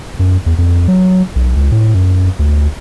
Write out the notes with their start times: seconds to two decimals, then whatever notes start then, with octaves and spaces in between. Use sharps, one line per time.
0.19 F#2
0.46 E2
0.58 F2
0.88 F#3
1.36 B1
1.56 C#2
1.72 A2
1.94 F#2
2.39 D2